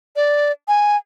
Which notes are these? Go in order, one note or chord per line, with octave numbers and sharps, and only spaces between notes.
D5
G#5